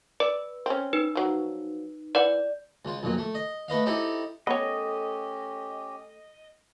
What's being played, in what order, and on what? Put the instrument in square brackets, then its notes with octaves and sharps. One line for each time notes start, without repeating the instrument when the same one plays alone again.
[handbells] B4 [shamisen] D5
[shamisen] C4 C#4
[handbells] D#4 B4
[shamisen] F3 F#3
[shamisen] E3 F#5 [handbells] D5
[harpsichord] C#2 F4
B1 F2 A#2
A3
D#5
A3 B4 D#5 F5
C4 D#4 E4 G4 A4
[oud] A3 A4 A#4 [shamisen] B3 C#5 [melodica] C#4 G4 [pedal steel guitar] D#5